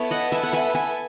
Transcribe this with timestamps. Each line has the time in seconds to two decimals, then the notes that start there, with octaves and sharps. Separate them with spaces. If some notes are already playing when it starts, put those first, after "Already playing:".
Already playing: B3 E4 A4 C#5
0.11 D#5 F#5
0.32 E5 G#5
0.43 F#5
0.53 E5 G#5
0.75 E5 G#5